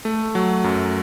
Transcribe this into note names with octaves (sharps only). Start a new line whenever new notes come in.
A3
F#3
F#2